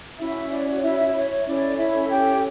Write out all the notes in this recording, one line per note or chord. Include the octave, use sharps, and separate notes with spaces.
C#4 E4 F#4 C#5 E5
D5
E4 E5
E4 E5
C#5
C#5
C#4 E4 A4 C#5 D5
E4 E5
G4 G5